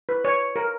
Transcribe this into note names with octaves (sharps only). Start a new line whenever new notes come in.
B4
C#5
A#4